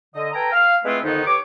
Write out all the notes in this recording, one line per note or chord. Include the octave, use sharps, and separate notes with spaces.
D3 D#5
A4 B4 G5 G#5 A#5
F5 F6
G#3 A3 C4 E4 F4 B4
F2 D3 D#3 B3 D#4
G4 B4 C#5 D6